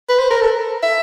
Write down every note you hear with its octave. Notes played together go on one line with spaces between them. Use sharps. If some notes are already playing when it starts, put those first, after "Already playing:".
B4
C5
A#4
A4
E5